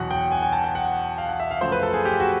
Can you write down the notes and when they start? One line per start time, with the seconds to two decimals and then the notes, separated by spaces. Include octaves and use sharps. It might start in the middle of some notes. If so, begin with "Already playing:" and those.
Already playing: E2 B2 F#3 F#5
0.11 G5
0.32 G#5
0.43 G#5
0.53 A5
0.64 G5
0.75 F#5
1.18 F5
1.29 F#5
1.40 E5
1.51 F5
1.61 F#2 C#3 F3 A3 C5
1.72 B4
1.83 A4
1.94 G#4
2.05 G4
2.20 F#4